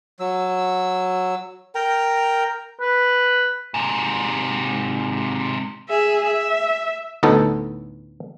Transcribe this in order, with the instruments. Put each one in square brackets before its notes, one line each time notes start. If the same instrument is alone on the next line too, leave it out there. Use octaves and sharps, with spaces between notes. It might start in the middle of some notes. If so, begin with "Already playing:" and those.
[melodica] F#3 E6
A#4 G5 A#5
[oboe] B4
[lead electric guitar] G#2 C3
[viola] G#4 E5
E5
[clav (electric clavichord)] D2 A2 B3 D#4 A4